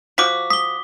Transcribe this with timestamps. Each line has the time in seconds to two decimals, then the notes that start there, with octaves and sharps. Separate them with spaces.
0.18 F3 F#4 D6 B6
0.50 D#6 B6 G7